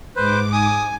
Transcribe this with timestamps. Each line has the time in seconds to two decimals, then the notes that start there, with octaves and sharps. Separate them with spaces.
0.16 G#2 B4 C5 D6
0.52 G#5 D#6